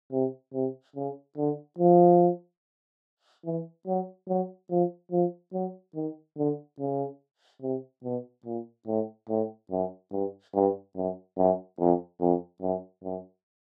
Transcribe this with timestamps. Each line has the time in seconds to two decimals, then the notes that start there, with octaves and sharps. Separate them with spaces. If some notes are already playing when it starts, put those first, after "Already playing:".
0.12 C3
0.53 C3
0.96 C#3
1.37 D3
1.79 F3
3.45 E3
3.87 F#3
4.29 F#3
4.70 F3
5.12 F3
5.53 F#3
5.95 D#3
6.38 D3
6.80 C#3
7.62 C3
8.04 B2
8.45 A#2
8.87 A2
9.29 A2
9.71 F#2
10.12 G2
10.55 G2
10.96 F#2
11.38 F#2
11.79 F2
12.21 F2
12.62 F#2
13.04 F#2